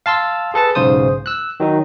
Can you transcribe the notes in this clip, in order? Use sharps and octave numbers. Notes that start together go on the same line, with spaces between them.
F5 A5 C6 E6
G#4 A4 B4 A5
B1 G#2 C#3 C5 D#6
E6 F#6
D#3 F#3 D#4